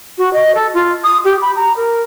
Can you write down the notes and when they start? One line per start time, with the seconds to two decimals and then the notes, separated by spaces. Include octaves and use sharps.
0.18 F#4
0.33 D#5
0.54 A4
0.74 F4
1.04 D#6
1.24 G4
1.42 B5
1.56 A#5
1.76 A#4